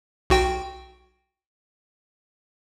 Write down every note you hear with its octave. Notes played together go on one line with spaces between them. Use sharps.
B1 F#4 G5